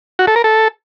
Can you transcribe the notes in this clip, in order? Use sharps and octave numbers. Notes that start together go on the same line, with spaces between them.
F#4
A4
A#4
A4